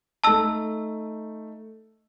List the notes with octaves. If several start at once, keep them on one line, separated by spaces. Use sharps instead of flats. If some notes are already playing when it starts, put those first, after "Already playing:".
A3 D#4 A5 E6